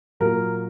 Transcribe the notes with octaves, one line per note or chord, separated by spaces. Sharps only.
A#2 F#3 A#3 A#4